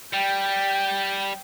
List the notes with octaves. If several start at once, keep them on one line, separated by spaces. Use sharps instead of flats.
G3 G5